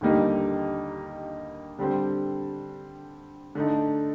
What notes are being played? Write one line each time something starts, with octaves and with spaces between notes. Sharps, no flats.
D#2 D3 G3 A#3 D#4
D3 G3 C4
D3 A3 D#4